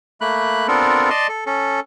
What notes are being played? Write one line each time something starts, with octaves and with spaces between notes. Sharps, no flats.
A3 A#3 B5 F#6
B3 C4 D4 F4 A4 A#4
D5 D#5 A5 C6
A4
C#4 A4